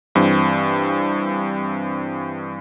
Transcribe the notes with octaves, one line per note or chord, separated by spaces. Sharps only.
G2 E3 C4